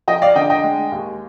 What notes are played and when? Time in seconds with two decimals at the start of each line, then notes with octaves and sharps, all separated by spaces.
0.08 F3 D#5 G5
0.22 D5 F5
0.35 D3 D#5 G5
0.50 D#5 G5
0.64 G#3
0.92 D#2